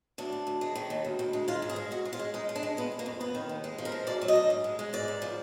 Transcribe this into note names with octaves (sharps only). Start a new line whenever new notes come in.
D2 D4
D2
D2
G#3
D#3
D#2
D2
D2
G#3
G#3 F4
G#2
G#4
G#3
G#2 F#4
G#3
F4
G#3
G#3 D#4
G#3
D4
G#3
F2 B3
F2
A#3
F2
D#2 B3
D#3
D#2
G#3
F3
A#4
G#3
D2 D5
F#3
D#5
D2
G#2
G#3
G#3
G#2 D5
G#2
F3